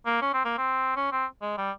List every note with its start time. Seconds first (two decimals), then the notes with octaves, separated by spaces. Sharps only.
0.06 A#3
0.22 C#4
0.34 C4
0.45 A#3
0.58 C4
0.96 C#4
1.12 C4
1.41 G#3
1.58 G3